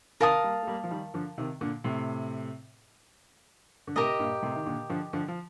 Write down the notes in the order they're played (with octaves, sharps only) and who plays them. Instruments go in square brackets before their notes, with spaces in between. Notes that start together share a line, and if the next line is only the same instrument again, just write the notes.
[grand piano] C3 D#3 [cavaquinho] A#4 F5 A5 D#6
[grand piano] G3 A#3
A3
G3 A#3
F3
D#3 G3
D3 F3
C3 D#3
A#2 D3
A2 C3
D3
[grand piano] A2 C3 [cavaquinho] G4 A#4 D#5 A#5
[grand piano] G2 A#2
A2 C3
D#3
A#2 D3
D3 F3
D3 F3
F3